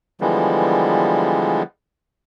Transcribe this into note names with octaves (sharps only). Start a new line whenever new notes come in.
D3 E3 F3 G3 G#3 B3